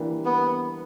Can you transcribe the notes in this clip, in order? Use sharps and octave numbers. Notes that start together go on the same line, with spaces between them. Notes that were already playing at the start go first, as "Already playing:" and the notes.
Already playing: E3 G3 A#3 D4 G4
B3